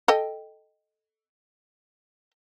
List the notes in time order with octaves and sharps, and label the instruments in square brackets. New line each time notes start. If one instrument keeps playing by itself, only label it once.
[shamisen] A4 D#5 G5